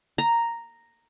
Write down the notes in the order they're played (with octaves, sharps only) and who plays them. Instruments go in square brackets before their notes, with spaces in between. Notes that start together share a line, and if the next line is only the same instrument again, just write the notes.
[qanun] A#5